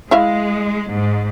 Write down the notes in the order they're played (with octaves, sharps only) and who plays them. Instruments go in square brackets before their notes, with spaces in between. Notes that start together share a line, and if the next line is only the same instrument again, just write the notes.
[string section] G#3 [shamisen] E4 E5 F5
[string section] G#2